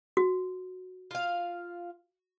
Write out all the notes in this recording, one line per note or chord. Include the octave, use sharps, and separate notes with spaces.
F#4
F4 F5